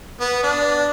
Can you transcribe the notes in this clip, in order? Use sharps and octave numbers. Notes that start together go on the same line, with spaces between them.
B3
D4